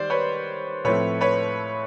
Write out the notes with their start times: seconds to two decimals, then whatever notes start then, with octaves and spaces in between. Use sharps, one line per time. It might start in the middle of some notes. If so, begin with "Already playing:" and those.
Already playing: D#3 G3 C5 D5
0.10 B4 C#5
0.84 A2 F3 A3 C4 B4 C#5
1.21 B4 C#5